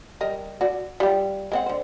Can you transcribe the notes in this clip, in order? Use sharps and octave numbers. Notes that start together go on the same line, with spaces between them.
G3 A#4 D#5
F#4 D5
G3 F4 G4
G#3 C4 F#5
D3 C5